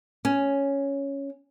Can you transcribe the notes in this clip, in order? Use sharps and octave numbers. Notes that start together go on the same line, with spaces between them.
C#4